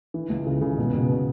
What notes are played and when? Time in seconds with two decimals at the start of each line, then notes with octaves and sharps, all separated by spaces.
0.14 E3
0.30 C#2
0.47 C#3
0.61 C#3
0.78 B2
0.94 B2
1.10 B2